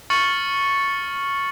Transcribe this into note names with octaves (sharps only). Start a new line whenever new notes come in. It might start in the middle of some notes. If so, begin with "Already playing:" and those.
C#6 F6 A6 C#7 F#7